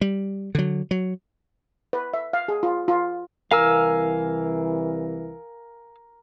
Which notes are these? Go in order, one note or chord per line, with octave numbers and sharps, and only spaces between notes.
G3
D3 F#3
F#3
B4
E5
F5
G#4
F4
F4
C2 E3 A#4 F5 G#5 E6